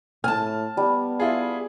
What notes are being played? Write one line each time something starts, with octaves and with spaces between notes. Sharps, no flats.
A2 G#5 A5 F6
G3 B3
E4 F4 G#4